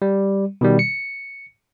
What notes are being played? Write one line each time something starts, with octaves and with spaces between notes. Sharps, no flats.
G3
B2 D#3 G3
C#7